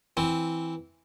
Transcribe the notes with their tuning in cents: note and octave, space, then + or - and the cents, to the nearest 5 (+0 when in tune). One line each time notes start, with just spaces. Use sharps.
E3 +0 C4 +0